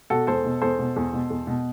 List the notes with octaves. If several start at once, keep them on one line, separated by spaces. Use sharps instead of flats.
B2 F#4 A4
E2 A4 C5
B2
E2 A4 C5
B2
E2
B2
E2
B2